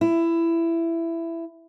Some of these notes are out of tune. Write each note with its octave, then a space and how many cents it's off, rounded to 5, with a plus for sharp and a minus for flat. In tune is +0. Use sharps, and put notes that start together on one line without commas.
E4 +15